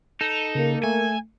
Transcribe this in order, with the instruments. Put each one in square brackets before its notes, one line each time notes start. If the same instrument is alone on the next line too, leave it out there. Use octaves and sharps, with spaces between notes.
[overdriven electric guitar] D#4 [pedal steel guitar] A4
[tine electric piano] C#3 [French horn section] A#3 A#4
[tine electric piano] A3 [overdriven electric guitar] G#5